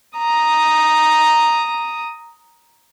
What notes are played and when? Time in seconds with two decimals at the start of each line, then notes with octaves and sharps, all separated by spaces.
0.18 A#5 D#6